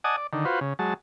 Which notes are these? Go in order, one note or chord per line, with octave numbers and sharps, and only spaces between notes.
D5 D#5 F#5 G#5 A5 D#6
D5
D3 D#3
F4 F#4 B4 C5
C#3
F#3 G#3 A5